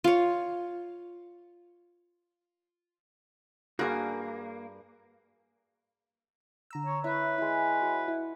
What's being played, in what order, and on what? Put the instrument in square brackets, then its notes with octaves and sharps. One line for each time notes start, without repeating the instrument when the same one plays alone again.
[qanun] F4 C#5
[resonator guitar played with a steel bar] G2 [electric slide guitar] A#3 [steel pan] F#4 [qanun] G#4 A#4
[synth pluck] D3 A#5 E6
[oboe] C#5
[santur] E4 [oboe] B4 [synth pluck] C#5 E5
[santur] G#3 E4
F#4
[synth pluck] E4